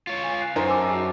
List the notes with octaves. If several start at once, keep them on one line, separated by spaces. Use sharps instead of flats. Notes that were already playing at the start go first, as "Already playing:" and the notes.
F4 C#5
G#5
F#6 C7
F#2 D#4 A#4 C5
A5 D6 E6
F#4 G#4